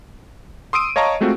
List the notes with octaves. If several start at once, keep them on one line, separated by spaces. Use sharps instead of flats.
C6 D#6 E6 D7 D#7
C#5 D#5 F5 A5 A#5 C#6
G#3 A3 C4 F4 F#4